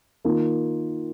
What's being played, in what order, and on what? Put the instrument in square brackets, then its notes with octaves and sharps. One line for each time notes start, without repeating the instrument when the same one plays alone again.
[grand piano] D#3 A#3 F4